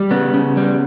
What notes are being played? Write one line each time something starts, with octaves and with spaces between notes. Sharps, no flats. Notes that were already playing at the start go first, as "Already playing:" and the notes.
Already playing: G3
C#3 B3
C#3
G3